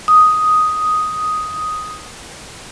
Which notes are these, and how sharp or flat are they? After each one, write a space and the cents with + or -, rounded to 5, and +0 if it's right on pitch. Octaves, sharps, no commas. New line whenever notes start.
D#6 +5